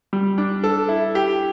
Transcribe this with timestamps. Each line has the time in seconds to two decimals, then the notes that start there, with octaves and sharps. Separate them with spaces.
0.13 G3
0.38 D4
0.64 A4
0.88 E4
1.15 G4